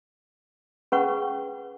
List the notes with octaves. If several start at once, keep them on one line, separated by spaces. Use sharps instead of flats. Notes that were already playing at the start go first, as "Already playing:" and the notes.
C#4 G#4 B4 F#5 C#6